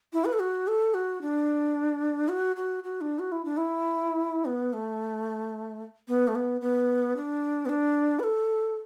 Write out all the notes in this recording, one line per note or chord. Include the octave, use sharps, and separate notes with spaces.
E4
B4
A4
F#4
A4
F#4
D4
F#4
F#4
F#4
D4
F#4
E4
D4
E4
B3
A3
B3
A3
B3
B3
D4
B3
D4
B4
A4